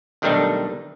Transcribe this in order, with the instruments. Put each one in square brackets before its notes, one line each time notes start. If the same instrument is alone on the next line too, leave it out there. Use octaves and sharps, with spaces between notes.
[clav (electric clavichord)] B1 D#3 G3 A3 D4 D#4